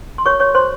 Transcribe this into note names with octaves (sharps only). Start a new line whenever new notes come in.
C6
F#4 A#4 C#5 C#6
C#5 C#6
F#4 C5 C6